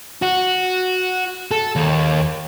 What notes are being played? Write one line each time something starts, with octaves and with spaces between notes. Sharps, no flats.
F#4
A4
D#2